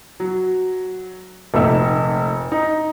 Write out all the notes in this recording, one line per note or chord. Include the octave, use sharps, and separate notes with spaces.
F#3
F1 A#1 A3 D#4 E5 E6
D#4 A#5